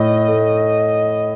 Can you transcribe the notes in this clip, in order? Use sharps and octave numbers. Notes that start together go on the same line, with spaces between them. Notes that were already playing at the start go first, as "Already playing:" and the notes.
Already playing: A2 D#5
A3